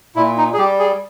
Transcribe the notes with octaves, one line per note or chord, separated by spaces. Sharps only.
A#2 E4
D#4
G#4
G3 G4
G#4